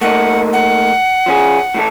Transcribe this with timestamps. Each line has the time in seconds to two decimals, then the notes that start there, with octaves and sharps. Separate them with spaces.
0.01 A3 A#3 D#4 F#5
0.53 F#5
1.26 F3 C#4 G#4
1.74 A2 E3 A4